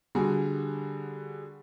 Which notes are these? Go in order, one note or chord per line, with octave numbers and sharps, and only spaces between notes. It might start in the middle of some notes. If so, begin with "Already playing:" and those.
D3 G3 F#4 G#4